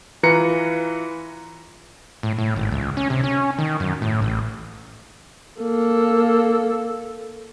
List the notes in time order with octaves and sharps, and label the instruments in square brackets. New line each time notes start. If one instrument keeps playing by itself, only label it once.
[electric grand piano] E3 F4 B4 A#5 C#7
[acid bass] A2
A2
G#1
C#2
C#4
C3
C#4
D#3
F#2
A2
A1
[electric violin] A#3 A4